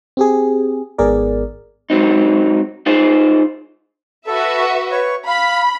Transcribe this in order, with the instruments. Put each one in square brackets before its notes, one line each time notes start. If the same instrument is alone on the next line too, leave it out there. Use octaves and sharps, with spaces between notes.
[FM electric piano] C4 G4 G#4
G#1 G#2 B3 G#4 A#4 D5
[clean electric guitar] G#2 F#3 C4 D#4
D#4 F4 G#4 C5 D#5
[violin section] F#4 B4 E5 [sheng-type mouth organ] A4
[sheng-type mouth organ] B4 C#5 C#6
[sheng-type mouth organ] F5 [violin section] B5